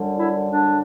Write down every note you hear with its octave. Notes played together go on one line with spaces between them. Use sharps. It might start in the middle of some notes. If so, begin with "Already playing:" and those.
Already playing: F#2 D3 G3
E4
D4